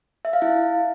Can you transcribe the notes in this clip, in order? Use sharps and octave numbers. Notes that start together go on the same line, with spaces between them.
E5
F5
E4